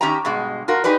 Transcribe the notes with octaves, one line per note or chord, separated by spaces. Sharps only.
D#3 C#4 G4 E5 G5 A#5
G2 B2 G#3
F4 F#4 A#4
D#4 G4 G#4 B4 D5